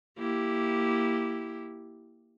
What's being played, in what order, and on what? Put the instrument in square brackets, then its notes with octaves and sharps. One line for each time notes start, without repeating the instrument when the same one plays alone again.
[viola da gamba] A#3 E4 G4